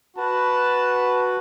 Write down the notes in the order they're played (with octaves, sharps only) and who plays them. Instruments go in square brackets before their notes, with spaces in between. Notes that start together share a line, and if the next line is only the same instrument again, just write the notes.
[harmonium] F#4 [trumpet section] B4 A5